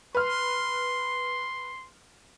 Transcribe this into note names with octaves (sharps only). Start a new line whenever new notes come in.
B4 C6 F6